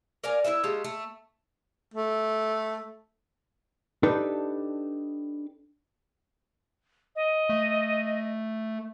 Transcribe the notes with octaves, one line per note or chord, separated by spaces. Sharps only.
A#4 D5 F5 G#5
E4 F4 B4 E5
G#3 A3 F4 G4
A3
A3
D4 D#4 G4 A4 B4
D#5
A3